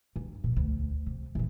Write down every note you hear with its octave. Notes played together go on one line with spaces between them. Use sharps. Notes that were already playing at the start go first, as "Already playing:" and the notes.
G2
A#2 F3
D2
C3
A#1 E3